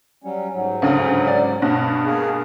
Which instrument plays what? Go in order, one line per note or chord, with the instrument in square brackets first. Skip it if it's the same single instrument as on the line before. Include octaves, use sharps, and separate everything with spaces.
[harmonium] F#3 G3 C#4
G#2 F#3
[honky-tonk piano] D2 G2 C#3
D5
G2 B2
[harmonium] A#3 G#4